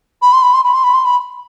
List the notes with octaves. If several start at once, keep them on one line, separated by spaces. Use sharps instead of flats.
B5
C6
B5
C6
B5
C6
B5
C6
B5